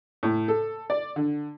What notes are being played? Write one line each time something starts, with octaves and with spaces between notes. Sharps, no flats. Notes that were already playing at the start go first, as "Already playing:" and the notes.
A2
A4
D5
D3